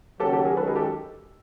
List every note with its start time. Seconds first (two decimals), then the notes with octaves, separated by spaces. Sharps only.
0.20 D#2 C#3 F#3 G4 A4
0.33 G4 A4
0.45 G#4 A#4
0.57 F#2 D#3 G#3 C#4 A4 B4
0.67 G#4 A#4
0.76 G4 A4